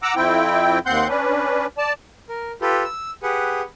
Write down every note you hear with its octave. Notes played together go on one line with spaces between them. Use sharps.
F#5 A#5 D6 E6
F2 C4 E4 G5
D#2 C4 F#5 C6 G6
C#4 D4 B4
D5 A5
A#4
F4 G4 A4 B4
E6
G4 G#4 B4 F#5